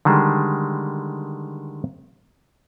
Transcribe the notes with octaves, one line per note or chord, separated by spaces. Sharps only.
D3 D#3 G3 G#3